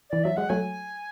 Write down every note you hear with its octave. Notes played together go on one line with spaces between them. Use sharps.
E3 D5
F#3 E5
G#3 F#5
F#3 A3 G#5